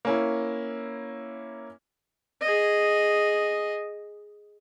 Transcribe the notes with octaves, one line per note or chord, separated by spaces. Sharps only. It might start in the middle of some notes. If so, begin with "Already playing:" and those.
A#3 C#4 E4
G#4 D#5